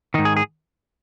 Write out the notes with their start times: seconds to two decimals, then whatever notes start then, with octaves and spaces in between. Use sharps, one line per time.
0.14 G#2 D#3 D#4
0.25 G#4
0.37 G#4